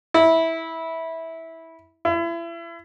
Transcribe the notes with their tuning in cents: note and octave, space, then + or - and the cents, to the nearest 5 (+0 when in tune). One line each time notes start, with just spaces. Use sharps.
E4 -15
E4 +35